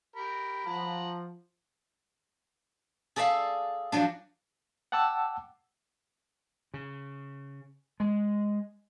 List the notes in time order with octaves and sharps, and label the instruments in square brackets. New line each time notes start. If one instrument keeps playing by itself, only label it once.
[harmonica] G4 A#4 [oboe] B5
[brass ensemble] F3 [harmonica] F#5 A#5
[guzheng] G#4 A4 D5 E5 F5
F3 F#3 D4
[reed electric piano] F#5 G5 A5 D6 E6
[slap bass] C#3
G#3